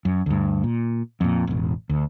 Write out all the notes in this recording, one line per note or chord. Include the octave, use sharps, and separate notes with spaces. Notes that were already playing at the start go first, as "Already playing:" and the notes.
F#2
D2 G2
A#2
F2 A#2
E1 A1
D2